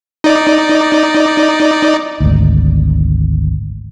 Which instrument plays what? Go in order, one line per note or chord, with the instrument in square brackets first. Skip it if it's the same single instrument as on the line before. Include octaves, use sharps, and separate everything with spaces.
[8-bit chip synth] D#4 D5
[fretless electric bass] G#1 D2